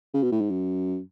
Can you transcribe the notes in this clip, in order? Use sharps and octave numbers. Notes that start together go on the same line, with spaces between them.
C#3
B2
A2
G#2
F#2